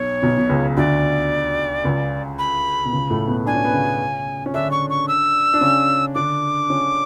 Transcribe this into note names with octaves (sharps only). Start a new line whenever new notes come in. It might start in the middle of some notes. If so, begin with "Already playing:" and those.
Already playing: B1 B2 C#5
B1 B2
B2
C#2 C#3
D2 D3 D5
C#2 C#3
B5
B2
C#2 C#3
A2 A3
B2 B3
D4 G#5
C#4
B3
C#3 C#4
C#4
D3 D4 E5
C#6
C#6
E6
D4
C#3 C#4
D3 D4 D6
C#3 C#4